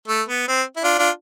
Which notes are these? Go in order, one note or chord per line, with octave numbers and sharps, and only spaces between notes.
A3
B3
C4
E4
D4 F4
D4 F4